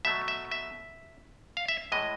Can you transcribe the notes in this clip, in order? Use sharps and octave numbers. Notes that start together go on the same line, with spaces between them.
B2 F#3 A3 E5
E5
E5
F5
E5
A2 E3 G#3 D#5